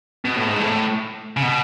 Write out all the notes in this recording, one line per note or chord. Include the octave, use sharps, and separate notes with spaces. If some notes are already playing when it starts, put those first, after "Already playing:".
B2
A2
G#2
A2
C#3
B2